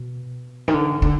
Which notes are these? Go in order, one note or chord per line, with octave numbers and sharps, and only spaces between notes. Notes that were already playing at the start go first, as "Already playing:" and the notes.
Already playing: B2
D#3
D3
D3